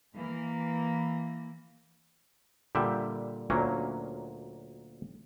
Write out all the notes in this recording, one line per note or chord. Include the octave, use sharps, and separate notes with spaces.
E3 A#3
A#2 D3 G3 E5 G5
D2 A#2 F#3 A#3 C#4